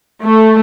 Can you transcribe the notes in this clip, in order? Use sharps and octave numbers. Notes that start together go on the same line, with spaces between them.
A3